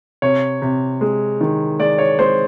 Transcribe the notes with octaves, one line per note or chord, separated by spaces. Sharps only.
C3 C#5
C3
G#3
D#3
G#3 D5
C#5
G#3 C5